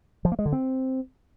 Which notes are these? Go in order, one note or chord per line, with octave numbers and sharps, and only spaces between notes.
F3
A#3
G#3
D3
C4